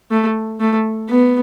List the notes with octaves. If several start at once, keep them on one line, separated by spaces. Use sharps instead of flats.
A3
A3
B3